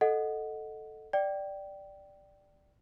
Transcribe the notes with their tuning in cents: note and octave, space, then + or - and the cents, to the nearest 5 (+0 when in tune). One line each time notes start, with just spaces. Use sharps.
A4 +0 D#5 +0 F#5 -5
D5 +0 G5 -15